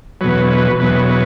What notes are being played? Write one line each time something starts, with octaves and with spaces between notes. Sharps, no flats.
E2 B2 F#3 B4
B4
E2 B2 F#3 B4
B4